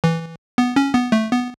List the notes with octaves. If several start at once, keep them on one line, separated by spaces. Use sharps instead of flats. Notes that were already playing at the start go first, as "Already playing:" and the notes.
E3
B3
C#4
B3
A3
B3